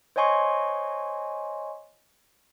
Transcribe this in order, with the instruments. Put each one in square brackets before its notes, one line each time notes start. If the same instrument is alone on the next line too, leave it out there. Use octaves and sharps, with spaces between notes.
[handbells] C5 C#5 D#5 G#5 C6 C#6